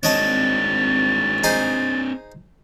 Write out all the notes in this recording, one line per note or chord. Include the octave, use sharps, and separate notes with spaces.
G#1 C4 D4 C#5 D#5 A5 A6
D#4 G#4 C5